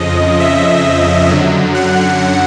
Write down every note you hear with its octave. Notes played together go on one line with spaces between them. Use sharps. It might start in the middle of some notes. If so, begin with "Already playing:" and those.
Already playing: F2 C#3 F3 D#5
E5
F#2 D3 F#3
F#5